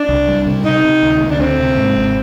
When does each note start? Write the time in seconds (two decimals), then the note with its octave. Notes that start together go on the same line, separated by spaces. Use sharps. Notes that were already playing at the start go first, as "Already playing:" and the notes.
Already playing: D4
0.09 C2
0.28 G3
0.46 C3
0.64 C3 D#4
0.84 C3
1.03 D2
1.21 D2
1.30 D4
1.40 D2 C4
1.59 C3
1.77 G#2
1.97 G#1